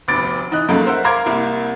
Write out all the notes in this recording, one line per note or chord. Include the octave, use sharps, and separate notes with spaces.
F1 D2 B3 D6 A6 D7
E3 D#4 D#5 F#6
C#2 F#2 F#3 A3 A#3
A#4 C5 E5 F#5
A#4 F5 A#5 C6 D6 G#6
C2 A#3 E4